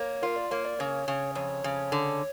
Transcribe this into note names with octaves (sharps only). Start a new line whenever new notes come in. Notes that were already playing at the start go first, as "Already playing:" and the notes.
Already playing: A#3 C#5
F4 A#4
D5
A#3 C#5
D5
C#3 C#5
C#3
F2 C#5
C#3
D3